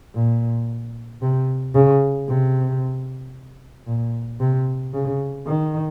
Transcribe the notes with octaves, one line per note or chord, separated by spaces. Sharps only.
A#2
C3
C#3
C3
A#2
C3
C#3
D#3